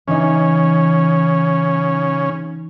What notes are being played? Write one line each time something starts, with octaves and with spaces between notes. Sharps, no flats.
C#3 E3 C#4 D#4